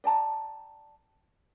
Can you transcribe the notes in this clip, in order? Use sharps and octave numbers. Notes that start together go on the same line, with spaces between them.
D5 G5 A5 A#5